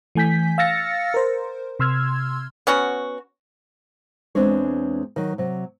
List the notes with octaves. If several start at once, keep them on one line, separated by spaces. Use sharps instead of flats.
E3 A3 G#5 G6 B6
F5 E6 F6 A6 A#6 C#7
A#4 C5
C3 C6 E6 F6 G#6
B3 C#4 F#4
E2 G#3 C4 D4 C#5
D#3 F#3
C3 F#3